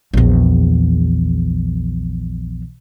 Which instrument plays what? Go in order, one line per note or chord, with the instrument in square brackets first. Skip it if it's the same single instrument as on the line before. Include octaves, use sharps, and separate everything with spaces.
[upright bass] A#1 E2